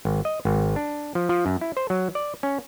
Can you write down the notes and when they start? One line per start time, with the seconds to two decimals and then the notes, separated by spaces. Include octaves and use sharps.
0.05 G#1
0.25 D#5
0.45 G#1
0.76 D4
1.15 F3
1.29 F3
1.46 F#2
1.61 E4
1.77 C5
1.90 F#3
2.15 D5
2.43 C#4